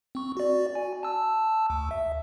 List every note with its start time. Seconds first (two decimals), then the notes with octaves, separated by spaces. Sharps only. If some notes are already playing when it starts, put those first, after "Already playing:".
0.15 C4 C#6
0.37 F#4 D5
0.75 G#5
1.03 A5 E6
1.70 D2
1.91 E5